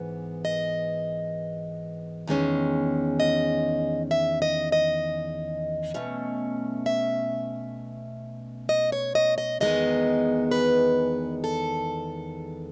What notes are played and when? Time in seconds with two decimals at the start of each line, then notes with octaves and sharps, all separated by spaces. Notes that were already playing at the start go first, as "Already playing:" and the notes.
Already playing: G#2 E3 B3
0.45 D#5
2.28 E2 D#3 G#3 C#4
3.20 D#5
4.11 E5
4.42 D#5
4.72 D#5
5.94 B2 A3 C#4
6.86 E5
8.69 D#5
8.92 C#5
9.15 D#5
9.38 D#5
9.61 E2 D#3 G#3 B3 D#5
10.51 B4
11.44 A4